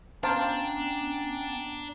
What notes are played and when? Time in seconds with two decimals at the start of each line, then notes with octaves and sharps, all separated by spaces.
0.23 B3 C#4 D4 C5 F5 G5 A5 A#5